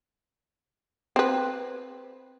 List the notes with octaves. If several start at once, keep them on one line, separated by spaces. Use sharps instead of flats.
C4 B4